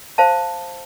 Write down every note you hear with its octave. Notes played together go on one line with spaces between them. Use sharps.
C5 F5 A5